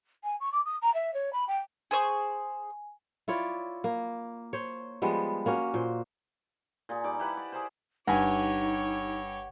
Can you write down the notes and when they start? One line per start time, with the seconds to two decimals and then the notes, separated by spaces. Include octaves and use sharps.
0.24 G#5
0.40 C#6
0.52 D6
0.65 D#6
0.82 A#5
0.94 E5
1.14 C#5
1.33 B5
1.48 G5
1.91 G#4 C5 G#5 C#6
3.28 E4 F4 C#5 D5
3.84 A#3
4.53 C5 C#5
5.02 F3 G3 G#3 B3
5.46 A#3 C#4 F#4
5.74 A#2 C5
6.89 A#2 G#4
7.04 G3 D#4 B5 D6
7.19 E4 G4 B4 F#5
7.37 D5
7.52 G#4 A#4 C5
8.07 G1 G2 D#4 G4 C#5 F#5 G#5